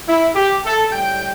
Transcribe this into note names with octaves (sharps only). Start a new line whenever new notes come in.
E4
G4
A4
A2 G3 G5